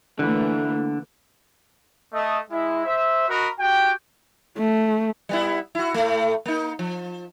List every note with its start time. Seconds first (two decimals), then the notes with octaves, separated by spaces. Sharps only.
0.19 D3 E3 A3 A#3
2.13 A3 D#5
2.51 G#3 E4
2.86 C5 E5
3.29 F#4 A#4 D#5 A#5 B5
3.60 F#4 G4 G5
4.58 A3
5.29 G3 B3 E4
5.75 E4 F#4
5.94 A2 A3
6.46 A#3 D#4
6.79 F3